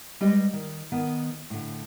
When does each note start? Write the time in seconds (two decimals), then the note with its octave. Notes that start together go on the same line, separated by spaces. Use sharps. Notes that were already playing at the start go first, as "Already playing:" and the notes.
0.21 G3 G#3 G4 B4 D#5
0.53 D#3
0.92 D#3 B3
1.50 A2 D3